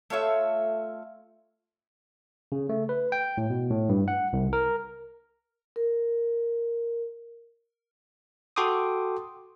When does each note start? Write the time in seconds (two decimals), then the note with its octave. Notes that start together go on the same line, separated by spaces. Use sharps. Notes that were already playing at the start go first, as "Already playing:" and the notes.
0.10 A3 F4 C#5 E5
2.52 C#3
2.69 A3
2.89 B4
3.12 G5
3.38 A2
3.50 B2
3.70 A2
3.89 G2
4.08 F#5
4.33 C2
4.53 A#4
5.76 A#4
8.56 F#4 A4 G5 C6 D6 D#6